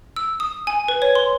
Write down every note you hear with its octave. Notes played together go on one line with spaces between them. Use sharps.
E6
D#6
G#5
B4
C#5
C6